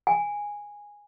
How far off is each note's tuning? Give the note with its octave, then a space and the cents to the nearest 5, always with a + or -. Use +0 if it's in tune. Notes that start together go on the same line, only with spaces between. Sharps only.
G#5 -10